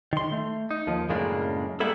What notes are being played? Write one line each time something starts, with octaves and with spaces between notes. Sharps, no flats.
D#3 C6
A3
D#4
D#2 F3
F#2 A2 C#3 G#3 A#3 D4
G3 G#3 A#3 B3 E4 A4